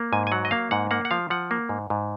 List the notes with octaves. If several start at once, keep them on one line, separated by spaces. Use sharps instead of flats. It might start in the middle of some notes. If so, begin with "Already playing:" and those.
Already playing: A#3
G#2 G#5
G#5
F#3 F#5
D#5
A#3 F5
G#2 F#5
A#3 F#5
F#5
F3 F5
F3 F#5
A#3
G#2
G#2